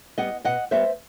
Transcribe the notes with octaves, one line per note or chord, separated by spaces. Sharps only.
G3 B3 D#5 F#5
B2 D#5 F#5
G3 B3 C5 E5